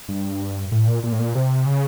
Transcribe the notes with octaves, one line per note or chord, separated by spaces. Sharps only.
G2
A2
A#2
A#2
A2
A#2
C3
C#3